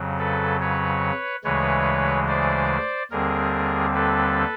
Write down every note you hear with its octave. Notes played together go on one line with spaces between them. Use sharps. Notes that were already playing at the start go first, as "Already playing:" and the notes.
Already playing: F2 C#3 F#3
A4 B4
B4 C#5
D2 C#3 E3 G#3 B4 C#5
C5 D5
D#2 D3 G3 C4 G#4 A#4
A4 B4